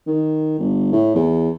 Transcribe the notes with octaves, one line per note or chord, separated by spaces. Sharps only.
D#3
G1
A2
E2